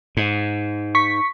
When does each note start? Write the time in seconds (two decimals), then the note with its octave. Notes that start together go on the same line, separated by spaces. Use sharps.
0.17 G#2
0.95 C#6 B6